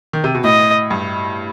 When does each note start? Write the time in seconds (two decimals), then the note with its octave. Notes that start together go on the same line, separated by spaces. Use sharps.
0.13 D#3
0.24 C3
0.35 B2
0.44 A2 D#5
0.91 G2